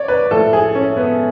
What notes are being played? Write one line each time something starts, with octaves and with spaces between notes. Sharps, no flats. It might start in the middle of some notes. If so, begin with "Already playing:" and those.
Already playing: C#5 D5
B4
A2 F3 A4
G#4
C#4
B3